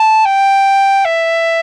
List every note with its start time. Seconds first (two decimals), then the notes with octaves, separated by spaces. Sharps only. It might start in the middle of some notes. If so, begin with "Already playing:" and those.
Already playing: A5
0.25 G5
1.05 E5